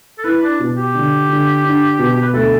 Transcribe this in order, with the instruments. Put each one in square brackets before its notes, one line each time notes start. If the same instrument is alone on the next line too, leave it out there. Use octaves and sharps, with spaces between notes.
[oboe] A4
[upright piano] E4 [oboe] B4
[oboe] D4
[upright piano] B2
[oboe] G4
[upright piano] D3
D3
D4
B2
[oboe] B4
[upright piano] D2 [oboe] A4